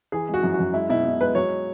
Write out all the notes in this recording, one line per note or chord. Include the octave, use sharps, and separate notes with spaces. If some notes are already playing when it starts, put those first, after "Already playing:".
E3 G#4
G#3
F#4
F#2
F#4
F#2
G#3 E4
B2 E4
B2
G#3 B4
F#3 C#5